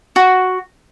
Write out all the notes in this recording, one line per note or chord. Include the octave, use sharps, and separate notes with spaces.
F#4